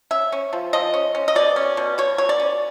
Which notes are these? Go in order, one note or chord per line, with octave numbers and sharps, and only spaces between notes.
C#4 E5
C#4
F3
F3 D#5
C#4
C#4
D#5
B2 D5
C#4
B2
B2 C#5
B2 C#5
D5
C#4